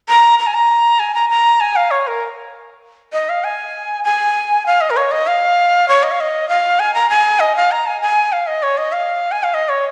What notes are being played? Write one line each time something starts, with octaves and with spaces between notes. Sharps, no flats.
A#5
A#5
G#5
A#5
G#5
A#5
A#5
G#5
F5
C#5
A#4
D#5
F5
G#5
G#5
F5
D#5
A#4
C#5
D#5
F5
C#5
D#5
F5
D#5
F5
G#5
A#5
G#5
D#5
F5
A#5
G#5
G#5
F5
D#5
C#5
D#5
F5
G#5
F5
D#5
C#5